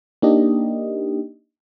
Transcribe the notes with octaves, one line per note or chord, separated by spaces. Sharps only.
A#3 D4 D#4 G4 D#5